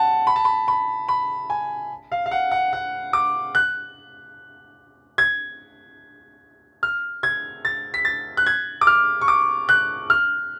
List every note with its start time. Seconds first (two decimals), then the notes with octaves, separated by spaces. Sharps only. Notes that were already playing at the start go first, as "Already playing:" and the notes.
Already playing: F#5 A5
0.27 B5
0.36 A5
0.45 B5
0.68 B5
1.08 B5
1.50 G#5
2.12 F5
2.26 F5
2.31 F#5
2.51 F#5
2.73 F#5
3.13 D6
3.55 F#6
5.18 G#6
6.83 F6
7.23 G#6
7.65 A6
7.94 B6
8.05 A6
8.37 F#6
8.46 G#6
8.81 D6
8.87 F6
9.21 C#6
9.28 D6
9.69 F#6
10.10 F6